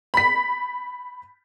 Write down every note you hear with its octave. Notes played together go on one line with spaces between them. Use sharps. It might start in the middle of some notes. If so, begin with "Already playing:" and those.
B5 B6